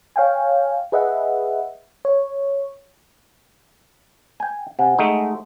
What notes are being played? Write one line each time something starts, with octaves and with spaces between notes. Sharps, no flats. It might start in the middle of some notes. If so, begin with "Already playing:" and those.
C#5 F5 G5 G#5
G#4 B4 D#5 E5 F#5
C#5
G5 G#5
C3 F#5 G#5
G#3 A3 D#4